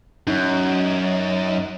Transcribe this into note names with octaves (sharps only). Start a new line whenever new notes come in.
F#2 D#4